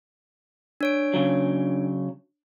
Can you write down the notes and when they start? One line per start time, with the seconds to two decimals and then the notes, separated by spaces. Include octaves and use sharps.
0.81 D4 C#5 D7
1.14 C#3 F#3